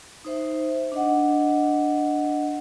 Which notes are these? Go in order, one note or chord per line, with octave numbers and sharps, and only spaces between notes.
D#4 C5 E5
D4 D#5 F#5